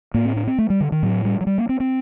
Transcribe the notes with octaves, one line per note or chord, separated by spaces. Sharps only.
A2 A#3
C4
D4
C4
A3
G3
D3
D#3
A2 F#3
G3
F#3
G3
A#3
C4
C4